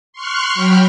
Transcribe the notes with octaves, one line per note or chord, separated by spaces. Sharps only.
C6 C#6 F6 F#6
F#3 G5 B5 F6